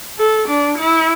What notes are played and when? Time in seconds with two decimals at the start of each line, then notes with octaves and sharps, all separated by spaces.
0.18 A4
0.48 D4
0.78 E4